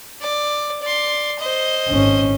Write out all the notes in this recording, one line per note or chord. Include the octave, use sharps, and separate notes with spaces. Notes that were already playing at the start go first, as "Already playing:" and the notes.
D5
D5 C6
C5 D#5
G#1 C#4